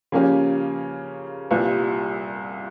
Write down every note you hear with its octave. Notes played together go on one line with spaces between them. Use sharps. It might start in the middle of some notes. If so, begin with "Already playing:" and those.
C#3 F3 A#3 C#4 G4
C2 A#2 G3